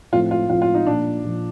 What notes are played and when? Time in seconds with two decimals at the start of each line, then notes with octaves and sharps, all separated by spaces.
0.12 A2 F3 A3 C4 F4
0.31 F4
0.49 A2 F3 A3 C4 F4
0.62 F4
0.75 D#4
0.86 A#2 F3 A#3 D4
1.24 A#2 F3 A#3